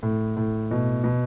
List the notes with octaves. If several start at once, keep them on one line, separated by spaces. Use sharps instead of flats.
A2
A2
B2
B2